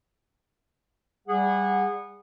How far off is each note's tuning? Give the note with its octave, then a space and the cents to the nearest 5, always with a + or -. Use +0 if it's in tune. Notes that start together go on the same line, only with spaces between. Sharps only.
G3 +0 G#4 -25 F#5 -15